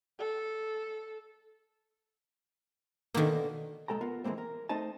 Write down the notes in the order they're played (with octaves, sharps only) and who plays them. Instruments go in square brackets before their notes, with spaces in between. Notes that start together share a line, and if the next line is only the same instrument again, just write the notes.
[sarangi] A4
[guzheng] B2 D3 [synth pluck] D#3 A#3
[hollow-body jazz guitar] B1 G#3 A4 G5 A#5
B3 F4 A#4
E3 F3 G#3 A#3 C4
A#4
A3 C4 D#4 C5 D#5 A5